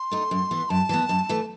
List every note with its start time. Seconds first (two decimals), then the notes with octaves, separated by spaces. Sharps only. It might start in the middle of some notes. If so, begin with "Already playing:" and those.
Already playing: C6
0.11 A3 D#4
0.31 F#2
0.51 E3 B3
0.70 F#2 A5
0.89 E3 B3
1.09 F#2
1.29 E3 A3